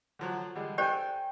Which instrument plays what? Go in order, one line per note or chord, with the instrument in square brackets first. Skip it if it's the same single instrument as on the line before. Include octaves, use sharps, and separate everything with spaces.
[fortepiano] D3 F3 F#3
D3 G3 G#3
[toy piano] G4 C5 D5 [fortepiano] A4 G#5 [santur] G5